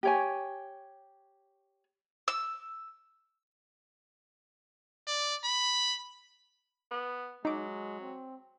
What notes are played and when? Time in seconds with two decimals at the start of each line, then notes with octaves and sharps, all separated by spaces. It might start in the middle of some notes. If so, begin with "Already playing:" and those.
0.03 G4 C#5 G#5
2.28 E6
5.07 D5
5.44 B5
6.91 B3
7.45 F#3 G#3 D#4 D6
8.00 C4